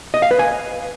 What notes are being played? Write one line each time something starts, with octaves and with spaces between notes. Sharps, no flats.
D#5
F5
B4
G#5